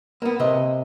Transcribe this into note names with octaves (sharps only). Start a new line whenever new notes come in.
A#3 B3
C3 D#5